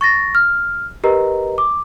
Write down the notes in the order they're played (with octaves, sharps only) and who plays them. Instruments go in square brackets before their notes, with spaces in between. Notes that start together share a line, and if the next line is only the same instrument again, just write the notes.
[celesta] C#6 A6 A#6
F6
G4 A#4 B4 D#5 A#5
D6